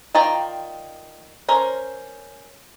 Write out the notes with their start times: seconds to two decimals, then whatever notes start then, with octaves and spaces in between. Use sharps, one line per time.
0.15 D#3 F4 D5 G5 A#5
1.48 C#4 A#4 C5